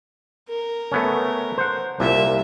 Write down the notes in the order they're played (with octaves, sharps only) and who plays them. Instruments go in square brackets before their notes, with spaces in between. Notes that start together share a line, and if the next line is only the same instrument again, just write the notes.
[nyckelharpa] A#4
[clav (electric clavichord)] A3 B3 C#4
C5 F#5
[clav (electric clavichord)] C2 A#2 [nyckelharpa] E5